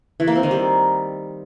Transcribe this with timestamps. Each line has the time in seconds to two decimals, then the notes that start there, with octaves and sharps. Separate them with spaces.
0.20 E3
0.28 A#3
0.35 C4
0.43 D#3
0.51 G3